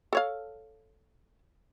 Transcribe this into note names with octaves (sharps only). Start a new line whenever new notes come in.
A4 C#5 F5